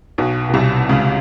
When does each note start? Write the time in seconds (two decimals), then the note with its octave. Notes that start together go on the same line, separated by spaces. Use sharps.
0.18 B1 B2
0.50 B2
0.54 C2 C3
0.89 C#2 C#3